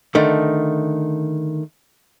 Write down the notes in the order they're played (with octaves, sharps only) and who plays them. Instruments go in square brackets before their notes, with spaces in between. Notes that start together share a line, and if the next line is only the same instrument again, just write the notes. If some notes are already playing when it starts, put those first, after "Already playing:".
[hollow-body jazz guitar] D3 D#3 A3